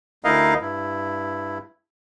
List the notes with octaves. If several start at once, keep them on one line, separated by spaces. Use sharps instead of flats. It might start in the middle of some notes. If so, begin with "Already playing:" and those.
D2 D#4 E4 A#4 D#5 F5
G2 E4